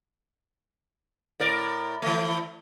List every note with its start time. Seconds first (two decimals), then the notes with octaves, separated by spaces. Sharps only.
1.40 A2 A#4 D5
2.02 E3 A3